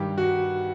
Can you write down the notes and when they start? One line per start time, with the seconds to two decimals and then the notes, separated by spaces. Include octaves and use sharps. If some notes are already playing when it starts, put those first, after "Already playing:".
Already playing: G2 D#3 G3 G4
0.18 F#4